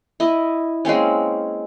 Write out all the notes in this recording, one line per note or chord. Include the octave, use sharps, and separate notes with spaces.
E4 D#5
G#3 A#3 C4 C#4